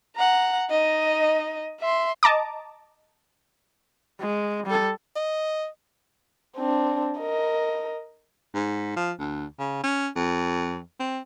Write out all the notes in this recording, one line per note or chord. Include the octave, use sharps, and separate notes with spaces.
F#5 A#5
D#4 D#5
E5 C6
D#5 A5 A#5 D6
G#3
G3 A4
D#5
C4 D4
A#4 D#5
G#2
F3
D2
C#3
C#4
F2
C4